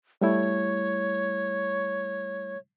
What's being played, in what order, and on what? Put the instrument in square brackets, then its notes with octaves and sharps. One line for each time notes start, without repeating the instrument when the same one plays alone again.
[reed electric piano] G3 A3 E4 [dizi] C#5